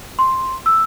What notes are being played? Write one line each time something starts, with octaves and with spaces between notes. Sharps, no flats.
C6
E6